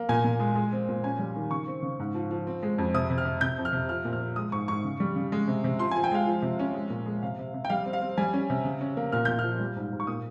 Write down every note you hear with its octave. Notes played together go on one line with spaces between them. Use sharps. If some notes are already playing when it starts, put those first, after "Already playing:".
Already playing: A#3
A#2 G#5
A#2
G#3
G#3
C4
A#2
C#4 G#5
G3
D#3
C#3 C#6
C4
C#3
G#2
F3
F3
C4
G#3
F2
C3 D#6
C3
F6
C3
C3 G6
F2
F6
C3
F3 F6
A#2
F6
C4
G#3 D#6
G#2 C#6
G#2 C#6
C#3
G3
C#3
G#3
C3
C3
F3 C6
F3 G#5
G5
G#3 F5
F3
C3
C#4
G#3
A#2
G#3
C3 F5
C3
C3
G5
G3 F5
C4
F5
C4
G3 G#5
C#4
C3
C#3
C#4
A#3
A#2 F6
A#2 G6
F3 F6
G3
G#2
G#2
C#6
A#2 D#6